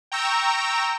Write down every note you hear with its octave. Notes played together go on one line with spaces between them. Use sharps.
G5 A#5 C#6 E6 G6